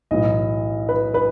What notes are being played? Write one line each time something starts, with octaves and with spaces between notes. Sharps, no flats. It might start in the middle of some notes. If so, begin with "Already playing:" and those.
B1 A2 E3 D#5
B4
B4